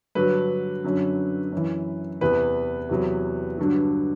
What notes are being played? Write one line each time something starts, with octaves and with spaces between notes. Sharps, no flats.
G2 D3 F#3 B4
F#2 D3 F#3
F#2 E3
E2 C3 E3 B4
E2 C3 F#3
G2 D3 F#3